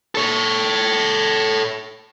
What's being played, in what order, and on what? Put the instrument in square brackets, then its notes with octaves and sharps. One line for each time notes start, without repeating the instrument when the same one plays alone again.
[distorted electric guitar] A4 C#5